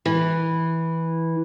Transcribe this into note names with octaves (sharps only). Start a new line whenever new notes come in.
E3